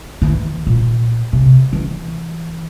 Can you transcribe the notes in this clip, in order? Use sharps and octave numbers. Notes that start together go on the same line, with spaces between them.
D#3 E3
A#2
C3
E3